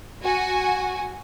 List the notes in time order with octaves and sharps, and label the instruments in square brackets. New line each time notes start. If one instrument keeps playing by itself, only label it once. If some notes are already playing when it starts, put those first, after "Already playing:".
[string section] F#4 G#5